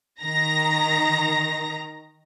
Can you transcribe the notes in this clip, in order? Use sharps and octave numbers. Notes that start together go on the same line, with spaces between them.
D#3 A#5 A#6